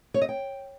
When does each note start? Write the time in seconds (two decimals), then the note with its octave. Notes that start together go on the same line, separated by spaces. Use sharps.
0.14 C#5
0.21 D#5
0.29 G5